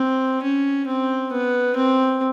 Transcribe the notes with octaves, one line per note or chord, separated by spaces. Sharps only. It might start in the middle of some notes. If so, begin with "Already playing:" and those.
Already playing: C4
C#4
C4
B3
C4